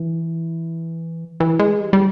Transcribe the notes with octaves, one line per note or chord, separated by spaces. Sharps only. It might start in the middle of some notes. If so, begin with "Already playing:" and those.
Already playing: E3
E3
G#3
G3
G3